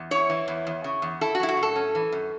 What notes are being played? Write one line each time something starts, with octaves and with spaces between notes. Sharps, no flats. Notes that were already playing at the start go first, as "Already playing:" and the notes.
Already playing: E2
E4 C#5
E3
E2
E2
C#3
E2
E4 A4
F#4
F#3 E4
F#4
A2
A4
C#4
E3
F#2